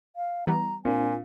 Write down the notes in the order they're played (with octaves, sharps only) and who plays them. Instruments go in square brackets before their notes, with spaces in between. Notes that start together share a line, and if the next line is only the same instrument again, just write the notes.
[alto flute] F5
[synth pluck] E3 G3 B3 [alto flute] A#5
[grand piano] A#2 [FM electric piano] C4 D4 F4 [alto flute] G#5